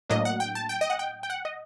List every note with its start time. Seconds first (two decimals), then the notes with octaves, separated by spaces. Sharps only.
0.10 A2 F#3 A#3 D4 D#5
0.25 F#5
0.40 G5
0.55 A5
0.69 G5
0.81 D#5
0.90 F#5
0.99 G5
1.23 G5
1.30 F#5
1.45 D#5